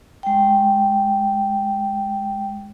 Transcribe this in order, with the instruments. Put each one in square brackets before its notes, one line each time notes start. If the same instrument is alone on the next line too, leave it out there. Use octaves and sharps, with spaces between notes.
[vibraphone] G#3 G5